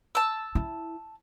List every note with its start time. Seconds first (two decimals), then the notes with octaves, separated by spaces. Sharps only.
0.15 A5 E6
0.55 E4